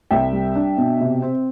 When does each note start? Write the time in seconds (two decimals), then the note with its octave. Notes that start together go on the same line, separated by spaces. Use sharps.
0.11 C2 E5 G5
0.33 G3
0.55 D4
0.78 B2
1.00 C3
1.22 C4